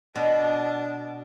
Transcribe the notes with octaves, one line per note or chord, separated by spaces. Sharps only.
B2 D4